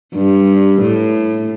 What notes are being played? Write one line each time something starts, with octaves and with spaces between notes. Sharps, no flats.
G2
A2